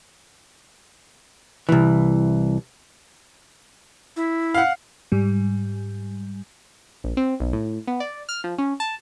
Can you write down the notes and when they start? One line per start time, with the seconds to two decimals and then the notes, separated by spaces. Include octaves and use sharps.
1.69 C2 E3
4.16 E4
4.54 F5 F#5
5.12 G#2 G3
7.04 A#1
7.17 C4
7.40 B1
7.53 A2
7.87 B3
8.00 D5
8.29 F6
8.44 F3
8.58 C#4
8.80 A5